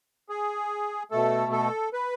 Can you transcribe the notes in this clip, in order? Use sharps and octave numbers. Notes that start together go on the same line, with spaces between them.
G#4
B2 A3 A4
A4
B4